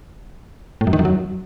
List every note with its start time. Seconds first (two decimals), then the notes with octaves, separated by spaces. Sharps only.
0.81 A2
0.87 F#2
0.93 D#3
0.99 F#2
1.05 F#3